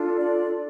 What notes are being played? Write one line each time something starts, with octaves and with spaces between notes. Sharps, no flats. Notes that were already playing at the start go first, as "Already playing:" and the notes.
Already playing: D4 F4 A4
D5